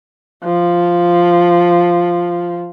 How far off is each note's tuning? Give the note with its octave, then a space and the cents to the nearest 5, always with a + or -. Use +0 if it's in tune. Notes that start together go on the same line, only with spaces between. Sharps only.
F3 +0